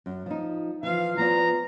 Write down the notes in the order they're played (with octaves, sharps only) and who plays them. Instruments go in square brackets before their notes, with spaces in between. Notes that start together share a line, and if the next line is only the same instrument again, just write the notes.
[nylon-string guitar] F#2
F3 D#4
[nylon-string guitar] E3 F3 [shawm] F5
[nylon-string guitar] F3 B3 D5 [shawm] A#5